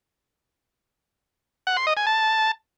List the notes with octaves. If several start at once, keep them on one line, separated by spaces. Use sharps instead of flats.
F#5
C6
D#5
G#5
A5